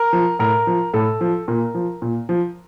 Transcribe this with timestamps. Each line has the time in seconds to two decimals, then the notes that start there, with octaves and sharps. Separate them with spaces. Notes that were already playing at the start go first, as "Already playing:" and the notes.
Already playing: A#4
0.13 F3
0.39 A2 A#4
0.67 F3
0.94 A2 A4
1.21 F3
1.48 A#2 A#4
1.75 F3
2.02 A#2
2.29 F3